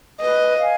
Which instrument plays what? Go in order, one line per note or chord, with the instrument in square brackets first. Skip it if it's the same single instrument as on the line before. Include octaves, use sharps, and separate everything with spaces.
[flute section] B4 [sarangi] D#5
[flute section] F5 G#5